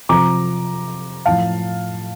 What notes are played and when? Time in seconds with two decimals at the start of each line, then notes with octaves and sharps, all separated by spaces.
0.09 C3 F3 A#5 D6
1.25 A2 F3 F5 A5